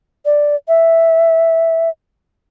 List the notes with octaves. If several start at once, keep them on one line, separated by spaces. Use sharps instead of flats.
D5
E5